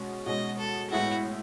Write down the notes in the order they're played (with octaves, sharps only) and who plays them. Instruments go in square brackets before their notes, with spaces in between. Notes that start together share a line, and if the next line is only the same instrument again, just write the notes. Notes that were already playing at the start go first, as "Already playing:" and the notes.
Already playing: [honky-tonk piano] B2 G#3 C#4
[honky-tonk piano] B2 G#3 C#4 [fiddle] D#5
[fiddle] A4
[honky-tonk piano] A2 G#3 B3 E4 G#4 [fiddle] F#4